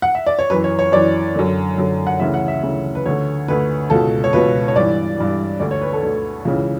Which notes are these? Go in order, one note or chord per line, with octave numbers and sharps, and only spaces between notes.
F#5
E5
D5
C#5
F#2 E3 B4
C#5
C#5
F#2 E3 D5
F#2 D3
F#2 D3
F#5
D2 C#3 E3 E5
F#5
E5
D2 C#3 E3
B4
D2 D3 C#5
D2 D3 B4
C#2 B2 A4
C#5
C#2 B2 B4
C#5
G2 E3 D5
G2 E3
D2 D3 D5
C#5
B4
A4
D2 D3
C#2 C#3 E3